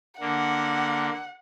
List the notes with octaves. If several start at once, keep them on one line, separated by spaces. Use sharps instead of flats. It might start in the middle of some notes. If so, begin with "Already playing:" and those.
D3 A#3 F#5